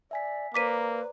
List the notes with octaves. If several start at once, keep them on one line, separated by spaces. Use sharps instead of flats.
D5 E5 G#5 B6
A#3 B4 C5 D5 A#5 D6 B6 D#7